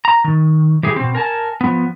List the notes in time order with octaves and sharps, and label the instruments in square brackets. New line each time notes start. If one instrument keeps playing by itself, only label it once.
[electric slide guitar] A#5
D#3
E3 G4 G#4
B2 C4
A#4 G#5 A5
F3 B3